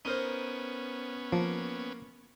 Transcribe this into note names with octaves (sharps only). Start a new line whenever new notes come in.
B3 C#4 D#4 A#4 C5
F3 A#3